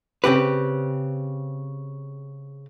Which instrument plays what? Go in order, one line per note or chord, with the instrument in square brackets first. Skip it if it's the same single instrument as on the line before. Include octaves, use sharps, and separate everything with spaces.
[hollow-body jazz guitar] C#3 C4 G4 B4